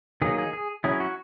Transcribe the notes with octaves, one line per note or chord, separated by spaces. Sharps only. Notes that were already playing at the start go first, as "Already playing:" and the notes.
D#3 F#3 A#3 D#4 G#4
G#4
G#4
F#3 C#4 E4 G#4
F#4